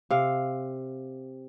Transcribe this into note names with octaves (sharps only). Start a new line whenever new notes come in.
C3 F5